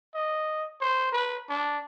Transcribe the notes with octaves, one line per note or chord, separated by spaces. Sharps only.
D#5
C5
B4
D4